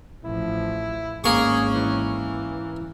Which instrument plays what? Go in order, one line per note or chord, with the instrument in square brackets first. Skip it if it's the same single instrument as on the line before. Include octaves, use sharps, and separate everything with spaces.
[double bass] A1 F3 [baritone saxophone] E4
[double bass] G#1 C#4 [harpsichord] A#3 C#6 [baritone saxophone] G#4
[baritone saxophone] E3